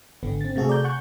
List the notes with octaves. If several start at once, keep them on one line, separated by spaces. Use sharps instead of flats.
G#1 D3 B3
C4 A6
C3 A3 F#4 G#4 A4
D5 A#5 G6
F#5 C#6 F#6 G6